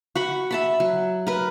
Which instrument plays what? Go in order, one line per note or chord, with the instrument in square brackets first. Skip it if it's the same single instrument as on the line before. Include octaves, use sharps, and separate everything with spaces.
[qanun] F#4 F#5 B5
E5 A5 B5
F#3
A#4 B4